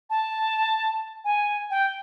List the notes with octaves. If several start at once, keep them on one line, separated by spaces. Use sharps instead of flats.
A5
G#5
G5